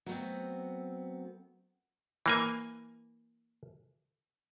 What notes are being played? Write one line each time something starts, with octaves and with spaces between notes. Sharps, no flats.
F#3 A3 B3 C4
E3 A#3 G#5